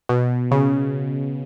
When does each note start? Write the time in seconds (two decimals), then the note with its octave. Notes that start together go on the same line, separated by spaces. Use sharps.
0.09 B2
0.51 C#3